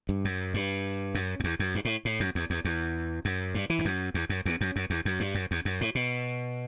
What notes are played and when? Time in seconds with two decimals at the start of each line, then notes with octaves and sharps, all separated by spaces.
0.09 G2
0.25 F#2
0.54 G2
1.15 F#2
1.40 F#2
1.44 E2
1.59 F#2
1.75 G2
1.85 A2
2.05 A2
2.20 F#2
2.35 E2
2.50 E2
2.65 E2
3.25 F#2
3.54 G2
3.70 E3
3.79 G2
3.85 F#2
4.14 E2
4.29 F#2
4.45 E2
4.61 F#2
4.76 F#2
4.90 E2
5.05 F#2
5.20 G2
5.35 F#2
5.51 E2
5.65 F#2
5.81 A2
5.95 B2